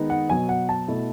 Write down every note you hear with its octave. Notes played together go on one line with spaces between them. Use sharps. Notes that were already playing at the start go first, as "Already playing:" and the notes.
Already playing: D#3 G#3 B3 D#4
F#5
B2 F#3 B3 G#5
F#5
A5
B2 A3 E4